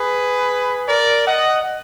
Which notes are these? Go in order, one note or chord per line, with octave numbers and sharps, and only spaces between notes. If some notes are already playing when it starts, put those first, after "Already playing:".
Already playing: G#4 B4
A#4 D5
D#5 F#5